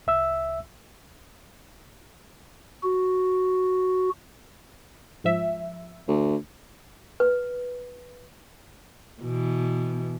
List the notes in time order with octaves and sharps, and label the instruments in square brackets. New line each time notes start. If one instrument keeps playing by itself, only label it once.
[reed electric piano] C2 E5 E6
[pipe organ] F#4
[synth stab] G#2 F3 E5
[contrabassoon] D2
[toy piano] B4
[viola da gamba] B2 E3